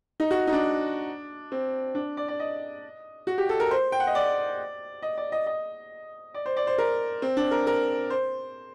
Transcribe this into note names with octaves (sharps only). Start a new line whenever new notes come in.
D#4
F#4
D#4
D4
C4
D4
D5
D5
D#5
F#4
G4
A4
A#4
C5
G5
F#5
D#5
D5
D#5
D5
D#5
D#5
D5
C5
D5
C5
A#4
C4
D4
A#4
A#4
C5